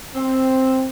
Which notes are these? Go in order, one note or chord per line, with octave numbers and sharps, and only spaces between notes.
C4